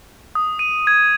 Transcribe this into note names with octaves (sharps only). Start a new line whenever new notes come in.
D#6
D#7
G#6